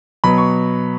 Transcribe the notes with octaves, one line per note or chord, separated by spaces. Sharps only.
B2 F#3 B3 B5
C#6